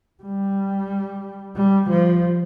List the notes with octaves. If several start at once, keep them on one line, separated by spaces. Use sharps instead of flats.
G3
G3
F3